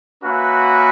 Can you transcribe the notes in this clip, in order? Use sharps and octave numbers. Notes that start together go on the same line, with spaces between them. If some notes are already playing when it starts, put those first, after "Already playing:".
A#3 C#4 F#4 B4 E5